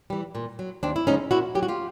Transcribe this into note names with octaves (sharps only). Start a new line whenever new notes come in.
E3 G3
A#2
F#3
D#2 C4 D4
E4
C#3 F3 G#3 C#4 D#4
A#2 E4 F#4
F#3 G4
F#4
F4 G4